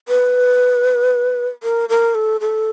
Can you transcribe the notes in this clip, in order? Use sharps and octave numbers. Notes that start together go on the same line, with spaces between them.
B4
A#4
A#4
A4
A4